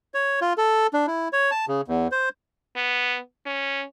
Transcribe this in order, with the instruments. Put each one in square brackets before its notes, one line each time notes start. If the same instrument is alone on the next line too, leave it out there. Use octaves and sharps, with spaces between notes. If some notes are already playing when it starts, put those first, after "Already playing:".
[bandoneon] C#5
F4
A4
D4
E4
C#5
A5
C#3
E2
C5
[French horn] B3
C#4